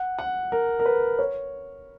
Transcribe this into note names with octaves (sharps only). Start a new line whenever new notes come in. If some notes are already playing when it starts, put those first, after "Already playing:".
Already playing: F#5
F#5
A#4
A#4
B4
C#5